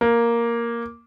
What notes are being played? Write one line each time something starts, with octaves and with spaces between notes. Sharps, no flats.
A#3